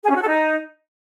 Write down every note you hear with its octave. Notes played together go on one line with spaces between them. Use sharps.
G#4
C#4
F#4
A4
D#4